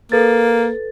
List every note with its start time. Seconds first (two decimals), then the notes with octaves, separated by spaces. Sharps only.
0.12 A#3 A4 B4 A6